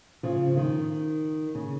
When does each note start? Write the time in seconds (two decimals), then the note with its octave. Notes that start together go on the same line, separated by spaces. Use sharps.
0.23 C#3 F3
0.57 D#3
1.55 C#3